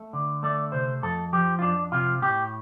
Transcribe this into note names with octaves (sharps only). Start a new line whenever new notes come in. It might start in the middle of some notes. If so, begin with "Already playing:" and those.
Already playing: A3
D3
A3 D5
C3 C5
F2 A4
F3 G4
F4
F2 D4
C3 F4
A2 G4